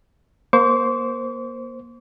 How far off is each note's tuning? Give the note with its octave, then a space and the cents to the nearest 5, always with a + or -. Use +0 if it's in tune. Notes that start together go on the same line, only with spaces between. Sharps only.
A#3 +25 C5 +5 D6 -45